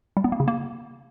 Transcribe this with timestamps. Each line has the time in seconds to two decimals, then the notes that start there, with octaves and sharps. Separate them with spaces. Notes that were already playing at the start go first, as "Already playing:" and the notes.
0.17 G3
0.24 B3
0.32 A#3
0.40 C#3
0.48 A#3